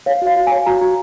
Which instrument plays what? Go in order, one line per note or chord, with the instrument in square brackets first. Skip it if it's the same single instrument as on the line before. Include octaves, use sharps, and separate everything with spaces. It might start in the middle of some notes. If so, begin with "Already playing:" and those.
[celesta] C#5 F5
F#4 F5
F#4
G#5
C#5
F#4 A#5
F#4